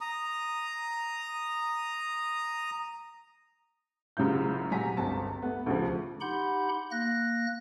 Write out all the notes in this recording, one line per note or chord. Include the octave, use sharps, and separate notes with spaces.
A#5 D#6
F#1 F#2 C#3 F#3 F4 G6
D#1 C3 F#3 G#5 A#5 B6
G1 C#2 C4 A5
A3 B3
D2 C#3 F3
D#4 G4 F#5 B5 C6 G6
A#3 F#6 A#6